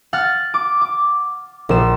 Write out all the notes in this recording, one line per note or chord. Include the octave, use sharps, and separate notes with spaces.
F#5 F6 A6
D6
D6
A#1 E7